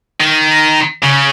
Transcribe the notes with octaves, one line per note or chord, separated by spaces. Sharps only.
D#3
C#3